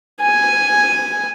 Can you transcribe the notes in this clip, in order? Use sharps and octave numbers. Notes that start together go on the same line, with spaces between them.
G#5